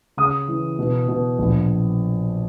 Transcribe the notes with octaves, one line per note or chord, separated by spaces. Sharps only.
C#3 D#6
E3
B2
B2
A#1